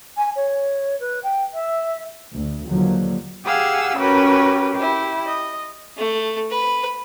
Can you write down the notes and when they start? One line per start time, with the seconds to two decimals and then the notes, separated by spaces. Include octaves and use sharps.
0.17 G#5
0.36 C#5
1.00 B4
1.23 G5
1.54 E5
2.34 D2
2.69 D#2 D3 F3 F#3
3.45 G4 G#4 F5 F#5 G#5 E6
3.96 C#4 F#4 G4 A#4 B4 C#5
4.75 E4 G4
5.27 D#5
5.97 A3
6.51 B4